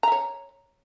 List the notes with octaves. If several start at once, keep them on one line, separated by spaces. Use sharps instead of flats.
C#5 E5 A#5